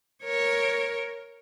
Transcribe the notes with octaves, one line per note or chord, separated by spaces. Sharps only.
A#4 C#5